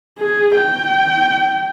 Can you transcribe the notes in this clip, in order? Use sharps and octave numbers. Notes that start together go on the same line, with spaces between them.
G#4
G5